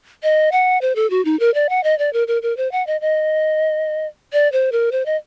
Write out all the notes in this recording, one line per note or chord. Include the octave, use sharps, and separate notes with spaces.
D#5
F#5
C5
A4
F#4
D#4
A#4
D5
F#5
D#5
D5
A#4
A#4
A#4
C5
F#5
D#5
D#5
D5
C5
A#4
C5
D#5